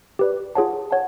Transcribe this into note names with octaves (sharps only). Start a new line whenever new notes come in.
G4 B4 D5
F4 G#4 C#5 F#5 A5
C#5 F#5 A5